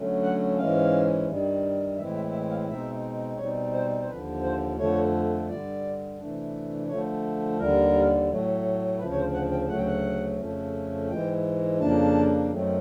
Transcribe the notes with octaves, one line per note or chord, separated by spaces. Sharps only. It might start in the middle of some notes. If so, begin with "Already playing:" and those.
Already playing: D3 F#3 A3 C#4
F#5
G#2 E3 G#3 C#4 F5
G2 D#3 G3
A2 E3 G#3 C4 E4 E5
E5
E5
F5
B2 G#3 C4 D#4 E5
B2 G3 C4 D#4 C#5
C5
C5
D#2 D3 F3 B4
C5
F2 D3 F3 A3 C#5
G2 D3 G3 D5
C3 E3 A3 D4
D3 F3 A3 C#5
D#2 D3 G3 A#4
A2 F#3 A3
D2 C#3 F3 B4
C#5
C5
F#5
G5
D2 C#3 F#3 A3 F#5
G5
F#5
F2 C#3 F3 A3 C#4
G#2 E3 G#3 G5
F2 C#3 F3 A#3 D4 A5
F#2 D#3 F#3 A3 C4